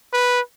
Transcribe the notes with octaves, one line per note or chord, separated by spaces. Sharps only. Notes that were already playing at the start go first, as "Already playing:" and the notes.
B4